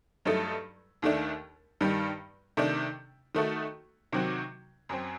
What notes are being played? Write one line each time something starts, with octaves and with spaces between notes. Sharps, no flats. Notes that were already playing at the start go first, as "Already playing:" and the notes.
G2 F#3 A3 D#4 A4
D#2 D#3 A3 D4
G2 D#3 G3
C3 D#3 A3 D4
D#3 A3 D#4 F#4 A4
C3 D#3 F#3 C4 F#4
F#2 F#3 C4